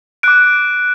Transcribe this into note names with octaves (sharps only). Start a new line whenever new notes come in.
D6 F#6 D7